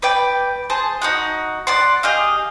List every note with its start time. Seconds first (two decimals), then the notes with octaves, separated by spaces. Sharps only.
0.02 B4 D5 G5
0.70 G#4 C5 A5
1.02 D#4 F#4 F#5
1.67 D5 F#5 C6
2.03 G4 G#4 D#5 F5